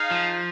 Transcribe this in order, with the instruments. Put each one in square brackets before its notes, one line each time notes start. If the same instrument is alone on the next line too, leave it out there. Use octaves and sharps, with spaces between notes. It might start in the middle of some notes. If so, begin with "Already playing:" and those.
Already playing: [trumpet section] D#4 G#4 F5
[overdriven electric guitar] F3